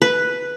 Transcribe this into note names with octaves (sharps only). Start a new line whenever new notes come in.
B4